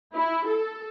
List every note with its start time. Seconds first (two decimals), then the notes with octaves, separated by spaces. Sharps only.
0.13 E4
0.46 A4